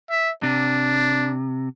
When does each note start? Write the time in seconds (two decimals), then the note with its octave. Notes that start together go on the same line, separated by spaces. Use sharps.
0.10 E5
0.43 C3 D4